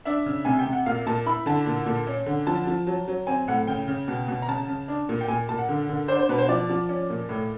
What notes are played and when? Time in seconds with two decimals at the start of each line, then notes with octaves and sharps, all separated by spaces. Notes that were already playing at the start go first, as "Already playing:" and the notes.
0.05 D4 E5
0.26 C#3
0.45 C3 G#5
0.59 G5
0.66 C3
0.72 F#5
0.86 A#2 F5
1.06 A#2 A5
1.26 E4 B5
1.46 D3 A5
1.66 A#2
1.86 A#2
2.07 C#4
2.26 D3
2.47 F3 A5
2.67 F3
2.87 F#3
3.08 F#3
3.27 C4 G#5
3.48 A2 F#5
3.67 C#3 G5
3.88 C#3
4.08 B2
4.28 B2
4.42 A#5
4.48 C#3 A5
4.68 C#3
4.88 D4
5.09 A#2
5.21 G5
5.28 A#2 G#5
5.49 A#2 A5
5.58 F#5
5.69 D3
5.89 D3
6.08 D4 C5
6.19 C5
6.29 B2 B4
6.38 C5
6.49 F3 D5
6.69 F3
6.89 C#4
7.10 A#2
7.29 A2